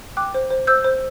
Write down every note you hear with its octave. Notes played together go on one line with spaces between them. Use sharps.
G5 D6 F#6
C5
C5
C5 E6 G6
C5